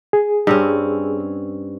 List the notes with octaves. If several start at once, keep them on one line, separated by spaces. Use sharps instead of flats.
G#4
G2 C4 C#4